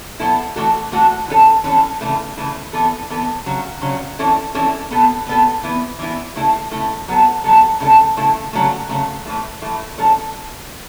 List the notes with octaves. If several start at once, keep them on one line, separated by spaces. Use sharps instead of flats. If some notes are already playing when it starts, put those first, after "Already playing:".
B2 F#3 B3 E4 A4
A2 E3 A3 F#4 A4
A2 E3 A3 F#4 A4
E3 C#4 A4
E3 C#4 A4
C#3 E3 A3
C#3 E3 A3
E3 B3 A4
E3 B3 A4
C#3 F#3 C#4
C#3 F#3 C#4
E3 C#4 E4 A4
E3 C#4 E4 A4
B2 B3 A4
B2 B3 A4
E3 B3 E4
E3 B3 E4
C#3 A3 E4 A4
C#3 A3 E4 A4
F#3 B3 A4
F#3 B3 A4
C#3 A3 E4 A4
C#3 A3 E4 A4
C#3 F#3 A3
C#3 F#3 A3
A2 E3 A3
A2 E3 A3
A2 F#3 C#4 A4